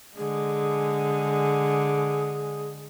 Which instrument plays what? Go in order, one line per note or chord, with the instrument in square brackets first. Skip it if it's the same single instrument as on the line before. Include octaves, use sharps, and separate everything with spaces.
[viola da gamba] D3 G#3 [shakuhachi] G#4